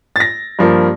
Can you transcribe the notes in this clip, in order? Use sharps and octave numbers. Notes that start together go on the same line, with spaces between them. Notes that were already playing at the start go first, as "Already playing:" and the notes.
A6
A#6
G2 F3 A#3